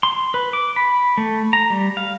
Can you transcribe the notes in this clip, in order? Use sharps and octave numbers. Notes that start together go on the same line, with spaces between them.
C6
B4
D6
B5
A3
A#5
G3
F5